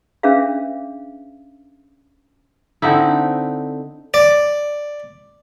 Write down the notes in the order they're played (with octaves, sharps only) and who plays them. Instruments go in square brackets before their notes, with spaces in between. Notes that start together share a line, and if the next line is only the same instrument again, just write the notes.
[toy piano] C#4 D4 G#4 B4 E5 F5
[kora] D3 C4 D#4 E4
[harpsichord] D5